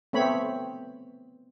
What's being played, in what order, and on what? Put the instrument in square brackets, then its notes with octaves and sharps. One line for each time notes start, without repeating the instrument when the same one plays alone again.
[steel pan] A3 B3 C4 C#5 B5